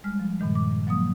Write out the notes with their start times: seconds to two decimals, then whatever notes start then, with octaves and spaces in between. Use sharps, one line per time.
0.04 G3 G#3 F6
0.20 F3
0.40 G2 A#2 D#3 G#3
0.55 D6
0.87 F3 F#3 A#3 D#6